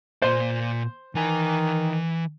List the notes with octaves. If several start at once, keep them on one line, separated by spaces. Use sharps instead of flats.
A#2 C5 D5
D#3 E3 G#5